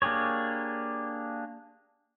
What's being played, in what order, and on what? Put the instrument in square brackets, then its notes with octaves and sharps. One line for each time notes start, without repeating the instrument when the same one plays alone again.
[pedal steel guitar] A#3 D4 G4 G#4 C#5